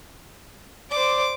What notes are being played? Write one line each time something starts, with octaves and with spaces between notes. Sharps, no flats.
C5 D5 D6